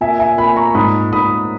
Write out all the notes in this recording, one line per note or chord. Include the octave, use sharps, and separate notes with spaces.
A#2 E5 G#5
E5 G#5
A#2 G#5 B5
A#5 C#6
G#2 B5 D#6
G#2 B5 D#6